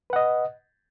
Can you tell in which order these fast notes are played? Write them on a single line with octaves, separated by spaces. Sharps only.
B4 F#5 D#5